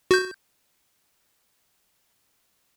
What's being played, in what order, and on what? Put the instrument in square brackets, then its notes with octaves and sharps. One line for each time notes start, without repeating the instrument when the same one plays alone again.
[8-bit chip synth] F#4 G6